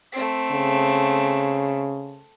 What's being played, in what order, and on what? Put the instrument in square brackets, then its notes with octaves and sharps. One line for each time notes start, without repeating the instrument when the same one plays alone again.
[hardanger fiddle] A3 C4
[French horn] C#3